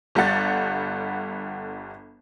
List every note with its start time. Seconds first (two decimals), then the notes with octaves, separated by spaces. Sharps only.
0.15 G1 G3 A4 F#5 A6